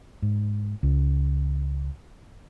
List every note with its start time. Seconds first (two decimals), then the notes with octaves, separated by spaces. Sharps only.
0.22 G#2
0.83 C#2